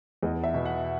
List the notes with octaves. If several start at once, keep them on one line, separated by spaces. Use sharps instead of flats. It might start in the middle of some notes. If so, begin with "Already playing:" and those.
E2 D#5
E5
B2
F#5